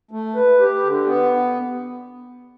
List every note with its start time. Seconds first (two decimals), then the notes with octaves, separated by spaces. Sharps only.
0.11 A3
0.35 B4
0.59 G4
0.83 D3
1.06 B3